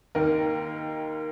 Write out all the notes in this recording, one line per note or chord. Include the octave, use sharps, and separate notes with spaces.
D#2 D#3 A#3 A#4